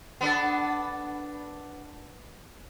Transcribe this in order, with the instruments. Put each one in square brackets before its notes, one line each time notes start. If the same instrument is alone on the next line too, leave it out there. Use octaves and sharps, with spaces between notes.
[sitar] B3 D4 A4